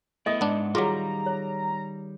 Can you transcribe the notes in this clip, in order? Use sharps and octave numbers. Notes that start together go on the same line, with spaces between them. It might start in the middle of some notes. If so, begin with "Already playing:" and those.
A3 B3 E4 D#5 E5 D#6
G#2 G#3 B3 D4 F#5
D#3 F#3 G3 F4 G#4 F5 A#5 D6
C#5